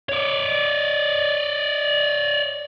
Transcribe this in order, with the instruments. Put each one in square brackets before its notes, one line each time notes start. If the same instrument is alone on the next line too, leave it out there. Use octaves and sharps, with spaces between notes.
[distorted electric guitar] C#5 D5